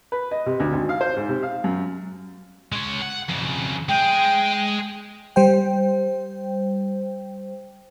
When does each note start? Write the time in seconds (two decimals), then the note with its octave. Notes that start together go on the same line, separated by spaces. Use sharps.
0.12 B4
0.31 D#5
0.46 C3
0.60 D2
0.72 G#1
0.89 F5
1.01 C5
1.16 G#2
1.29 C3
1.43 F5
1.64 F#2
2.72 G#3 C#5
3.02 F#5
3.29 F2 C#3
3.89 G#3 G#4 G5
5.36 G3 C5 G5